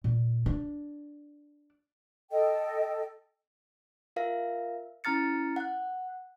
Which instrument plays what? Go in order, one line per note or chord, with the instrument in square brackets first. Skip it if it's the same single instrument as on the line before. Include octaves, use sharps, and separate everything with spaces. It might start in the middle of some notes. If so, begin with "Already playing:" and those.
[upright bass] A#2
D4
[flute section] A4 D#5 G5
[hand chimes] F4 A#4 E5 F5 A#6
C#4 E4 A#5 F6 A6 C#7
F#5 F#6